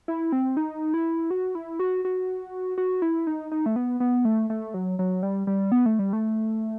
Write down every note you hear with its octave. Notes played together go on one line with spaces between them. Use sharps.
E4
C4
D#4
E4
F#4
E4
F#4
F#4
F#4
E4
D#4
D#4
A3
B3
B3
A3
A3
F#3
F#3
G3
G3
B3
A3
G3
A3